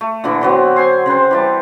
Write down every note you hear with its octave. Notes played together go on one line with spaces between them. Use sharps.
A3
A#2 D3 E3
D3 F#3 B3 C4
C5 G#5 C6
C#3 C4 B4 C5
E3 G3 A5